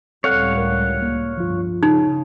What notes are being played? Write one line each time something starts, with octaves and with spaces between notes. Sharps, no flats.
C#2 A2 G3 C4 A4 C#5 F5 F#5
A#4
C2 A#3
G1 F3 F4
C#3 D#4